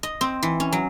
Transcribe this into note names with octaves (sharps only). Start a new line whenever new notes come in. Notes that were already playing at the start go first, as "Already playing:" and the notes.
D#5
C4
E3
C#4
F#3